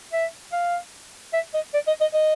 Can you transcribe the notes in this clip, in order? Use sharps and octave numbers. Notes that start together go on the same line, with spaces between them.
E5
F5
E5
D#5
D5
D#5
D#5
D#5